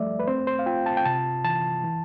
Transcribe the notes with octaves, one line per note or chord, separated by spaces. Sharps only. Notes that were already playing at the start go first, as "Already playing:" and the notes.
Already playing: F3 G3 A3 D5 E5
B4
C4 C5
C5
F5
F4 G5
A5
G5
C3 A5
E3 A5
E3